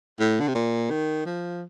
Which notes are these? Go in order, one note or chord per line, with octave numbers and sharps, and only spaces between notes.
A2
D3
C3
A#2
D#3
F3